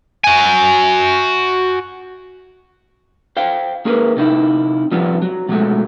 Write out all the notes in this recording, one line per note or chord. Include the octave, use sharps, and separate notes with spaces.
F#4 G#5
C5 F5 G5
A#3 G#4 A#4 B4
C3 D#4 E4
F3 G3 B3 C4
F#3
B2 F#3 G#3 A3